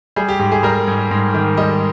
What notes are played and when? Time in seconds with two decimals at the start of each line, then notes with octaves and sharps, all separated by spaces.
0.16 G3 G#4
0.29 G4
0.39 G#2 G4
0.52 G#4
0.63 G3 A#4
0.88 G#2
1.11 G#2
1.34 D#3
1.57 G3 D#5